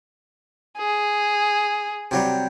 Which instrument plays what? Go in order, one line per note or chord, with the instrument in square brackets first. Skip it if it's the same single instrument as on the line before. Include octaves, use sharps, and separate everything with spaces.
[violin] G#4
[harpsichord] C3 F#3 G3